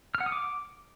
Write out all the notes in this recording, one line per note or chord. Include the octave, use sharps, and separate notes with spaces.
F6
F#5
D#6
D6